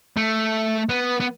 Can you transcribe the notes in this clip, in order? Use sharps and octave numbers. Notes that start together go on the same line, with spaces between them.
A3
B3
B3